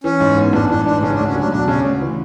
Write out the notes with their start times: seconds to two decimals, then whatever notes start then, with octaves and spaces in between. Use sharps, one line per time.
0.04 E3 C#4
0.20 G#2
0.37 B3
0.53 A1 D4
0.69 E3 D4
0.86 G#2 D4
1.02 C#3 C#4
1.15 D4
1.19 D2
1.27 C#4
1.35 F#3 D4
1.52 E1 D4
1.68 C#3 C#4
1.85 D2
2.01 E3